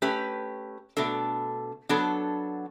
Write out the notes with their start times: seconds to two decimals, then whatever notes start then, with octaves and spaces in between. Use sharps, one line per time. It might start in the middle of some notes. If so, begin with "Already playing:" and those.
0.02 A3 C#4 G4 B4
0.97 B2 A3 D4 A4
1.89 F#3 B3 D4 A4